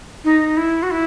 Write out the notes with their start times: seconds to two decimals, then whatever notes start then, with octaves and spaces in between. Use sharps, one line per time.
0.24 D#4
0.57 E4
0.82 F#4
0.90 E4